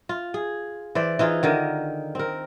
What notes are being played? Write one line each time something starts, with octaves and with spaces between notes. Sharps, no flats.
F4
G#4
E3 C5 D5
E3 D#4 F4 G#4
D3 D#3 A#4
C4 A#4